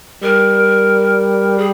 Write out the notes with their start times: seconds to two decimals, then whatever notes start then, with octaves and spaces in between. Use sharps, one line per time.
0.22 G3 A#4
1.58 G#4